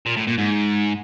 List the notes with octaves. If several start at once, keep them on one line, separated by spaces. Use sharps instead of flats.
A#2
A2
A#2
G#2